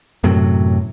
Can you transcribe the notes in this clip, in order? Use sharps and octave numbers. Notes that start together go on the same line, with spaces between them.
F#2 A2 C3 F#3